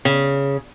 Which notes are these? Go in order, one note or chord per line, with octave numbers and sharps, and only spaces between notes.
C#3